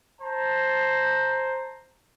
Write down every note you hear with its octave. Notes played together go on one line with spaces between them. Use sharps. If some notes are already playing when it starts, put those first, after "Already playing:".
C5 A5 A#5